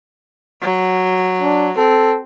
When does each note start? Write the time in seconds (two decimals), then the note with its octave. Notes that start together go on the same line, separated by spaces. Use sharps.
0.62 F#3
1.42 D4
1.77 C4 A4